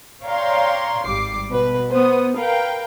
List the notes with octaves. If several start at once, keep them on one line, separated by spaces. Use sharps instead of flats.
C#5 D5 F5 G5 A#5 C6
G#1 G3 D6 C7
B2 B4
B3 C5 D#6
A#4 B4 F5 G5